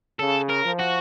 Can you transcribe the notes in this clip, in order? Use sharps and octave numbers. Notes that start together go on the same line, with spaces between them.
C#3 A4
A#4
F3
F#4